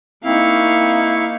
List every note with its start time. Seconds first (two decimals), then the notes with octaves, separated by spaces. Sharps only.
0.24 A#3 C4 D#4 E4 F5 C#6